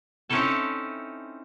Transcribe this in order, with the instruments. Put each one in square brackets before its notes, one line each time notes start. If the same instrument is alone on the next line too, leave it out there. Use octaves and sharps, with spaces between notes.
[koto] C4 C#4 D#4 E4 A4 A5